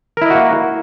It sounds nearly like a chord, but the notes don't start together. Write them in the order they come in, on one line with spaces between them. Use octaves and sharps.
A#4 E4 D#5 F#4 A#3